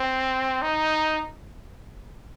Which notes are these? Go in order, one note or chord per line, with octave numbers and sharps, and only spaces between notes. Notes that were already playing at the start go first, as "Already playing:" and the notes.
Already playing: C4
D#4